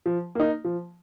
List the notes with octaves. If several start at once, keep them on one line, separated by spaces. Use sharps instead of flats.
F3
A#3 D#4
F3